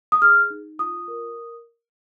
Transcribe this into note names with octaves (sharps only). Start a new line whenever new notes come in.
D#6
G#4 F6
D#4
F4 D#6
A#4